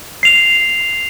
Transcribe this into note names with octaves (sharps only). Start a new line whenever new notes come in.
C7 F7